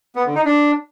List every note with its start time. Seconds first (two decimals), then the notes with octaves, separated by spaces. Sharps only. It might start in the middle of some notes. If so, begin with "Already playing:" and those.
0.15 B3
0.25 D3
0.35 D#4
0.45 D4